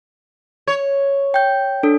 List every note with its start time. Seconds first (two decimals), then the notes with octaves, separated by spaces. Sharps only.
0.67 C#5
1.34 G5 G6
1.83 D4 A4